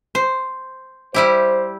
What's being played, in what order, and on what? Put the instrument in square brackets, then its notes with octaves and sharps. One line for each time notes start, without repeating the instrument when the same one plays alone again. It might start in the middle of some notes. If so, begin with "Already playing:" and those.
[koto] C5
[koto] G3 E4 G4 [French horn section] C5